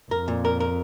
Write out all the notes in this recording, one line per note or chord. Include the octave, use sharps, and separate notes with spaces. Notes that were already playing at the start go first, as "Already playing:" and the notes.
F2 A#4
A#2
A#4
A#4